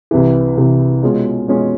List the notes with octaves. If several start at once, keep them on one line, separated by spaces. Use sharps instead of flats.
C2 C3 E3
C2 C3 E3
B2 G#3 C#4 F4 G#4
B2 G#3 C#4 F4 G#4